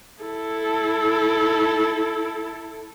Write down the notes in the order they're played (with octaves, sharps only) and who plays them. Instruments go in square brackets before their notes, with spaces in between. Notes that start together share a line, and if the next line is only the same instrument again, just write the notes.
[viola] E4 A4